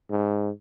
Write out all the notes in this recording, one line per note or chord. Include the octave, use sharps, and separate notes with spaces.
G#2